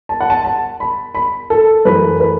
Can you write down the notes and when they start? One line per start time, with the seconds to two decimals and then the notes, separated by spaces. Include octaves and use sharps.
0.09 A5
0.21 F#5
0.30 A5
0.45 A5
0.80 B5
1.15 B5
1.50 A4
1.85 F#2 E3 A3 B4
2.20 B4